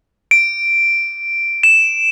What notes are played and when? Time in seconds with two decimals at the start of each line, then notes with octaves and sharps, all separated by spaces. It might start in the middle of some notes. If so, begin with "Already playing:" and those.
0.31 D7
1.63 E7